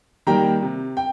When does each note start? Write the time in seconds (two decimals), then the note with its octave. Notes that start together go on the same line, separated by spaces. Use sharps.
0.27 D#3 G3 A#3 G5 A#5
0.62 C3
0.97 G5